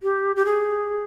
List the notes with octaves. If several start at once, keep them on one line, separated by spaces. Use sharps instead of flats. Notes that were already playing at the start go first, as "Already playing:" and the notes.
G4
G4
G#4